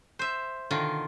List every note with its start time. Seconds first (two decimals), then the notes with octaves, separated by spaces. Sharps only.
0.19 C5 E5
0.71 B2 D3 D#3 F4